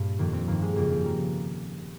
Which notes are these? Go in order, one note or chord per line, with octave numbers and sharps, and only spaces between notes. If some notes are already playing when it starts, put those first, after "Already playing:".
Already playing: G2 A#2
F2 D#3 A#3
C4
G2 D#3 A#3
G#3
F2 C#3 F3 A#3
G4
F3 A#4